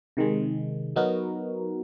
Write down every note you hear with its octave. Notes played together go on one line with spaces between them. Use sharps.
C3 D#3 G#3
F#3 B3 D#4 F#4 A#4